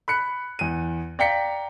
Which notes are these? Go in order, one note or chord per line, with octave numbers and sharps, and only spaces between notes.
B5 F#6 C#7
E2 D#7
D5 F5 G5 A#5 B6 C#7